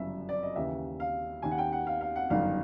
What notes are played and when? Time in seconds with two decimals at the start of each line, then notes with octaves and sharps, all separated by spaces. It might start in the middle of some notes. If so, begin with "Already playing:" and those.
Already playing: G1 F#2 C#3 E3 E5
0.29 D5
0.43 D#5
0.56 D#2 C#3 E3 E5
1.00 F5
1.42 D#2 D#3 G#5
1.51 F#5
1.58 G5
1.72 F#5
1.87 F5
2.01 F5
2.16 F#5
2.30 G1 F#2 D#3 F5